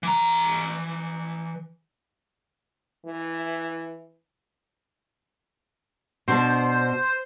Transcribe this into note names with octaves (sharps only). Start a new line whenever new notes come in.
E3 A#5
E3
B2 D4 C5